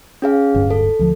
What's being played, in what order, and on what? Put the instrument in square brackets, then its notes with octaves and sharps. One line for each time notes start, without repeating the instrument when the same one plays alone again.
[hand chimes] C#4 G#4 F5
[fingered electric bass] D1 D2 G2
[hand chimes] A4
[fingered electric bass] D2 F3